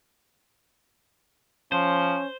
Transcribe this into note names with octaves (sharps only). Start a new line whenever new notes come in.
F3 C#4 C5